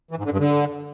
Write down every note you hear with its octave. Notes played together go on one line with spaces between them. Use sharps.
E3
G#2
D3
G2
D3